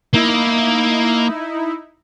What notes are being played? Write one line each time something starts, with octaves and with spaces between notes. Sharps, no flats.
A#3 D#4 E4